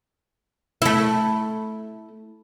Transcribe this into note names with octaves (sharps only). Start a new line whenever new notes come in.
A3 E4